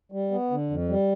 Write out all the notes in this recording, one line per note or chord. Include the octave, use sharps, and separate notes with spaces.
G3
B3
D3
F2
G3